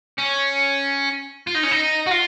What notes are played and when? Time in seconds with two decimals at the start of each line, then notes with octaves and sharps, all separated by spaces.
0.18 C#4
1.47 F4
1.55 D#4
1.63 C#4
1.71 D#4
2.07 F#4
2.11 F4